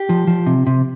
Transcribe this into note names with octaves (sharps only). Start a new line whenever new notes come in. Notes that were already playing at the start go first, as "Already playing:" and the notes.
Already playing: G4
F3
F3
C3
C3